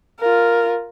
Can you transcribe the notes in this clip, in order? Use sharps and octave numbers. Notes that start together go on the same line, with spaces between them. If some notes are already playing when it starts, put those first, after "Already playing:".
F4 A#4